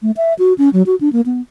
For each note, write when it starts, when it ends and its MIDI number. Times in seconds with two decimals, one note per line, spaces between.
0.02 0.11 57
0.17 0.33 76
0.39 0.53 66
0.58 0.69 61
0.73 0.83 54
0.86 0.95 66
1.01 1.09 62
1.13 1.21 58
1.26 1.41 59